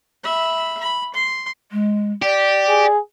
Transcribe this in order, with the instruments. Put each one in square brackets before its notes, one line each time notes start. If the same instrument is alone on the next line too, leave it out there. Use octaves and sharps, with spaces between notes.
[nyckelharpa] E5 B5
B5
C6
[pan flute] G#3
[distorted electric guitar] G4 [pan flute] D5
[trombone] G#4